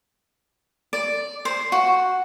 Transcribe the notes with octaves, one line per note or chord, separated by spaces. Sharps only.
D5
C5
F#4